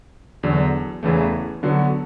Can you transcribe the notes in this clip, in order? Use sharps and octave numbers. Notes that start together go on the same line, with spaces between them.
E2 D3 F#3
E2 C#3 E3 A3
D3 F#3 B3 F#4